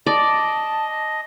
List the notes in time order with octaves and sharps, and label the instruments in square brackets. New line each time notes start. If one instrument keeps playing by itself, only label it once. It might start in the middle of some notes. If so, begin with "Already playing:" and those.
[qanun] D5 [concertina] D#5 [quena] A5